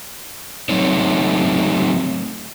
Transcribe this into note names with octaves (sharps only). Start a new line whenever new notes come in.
F#3 A3 C4 D#4 C#5